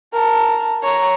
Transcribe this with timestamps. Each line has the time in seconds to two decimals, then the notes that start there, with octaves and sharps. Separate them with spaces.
0.13 A#4 A5
0.83 C#5 A#5